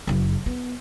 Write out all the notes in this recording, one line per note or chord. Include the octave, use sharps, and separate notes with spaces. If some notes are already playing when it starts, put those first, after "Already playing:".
F#1 F#2
B3